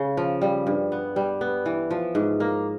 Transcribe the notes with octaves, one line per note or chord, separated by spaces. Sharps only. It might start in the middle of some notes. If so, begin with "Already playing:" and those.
Already playing: C#3
F3
G3
G2
B3
G3
B3
E3
F3
G#2
A#3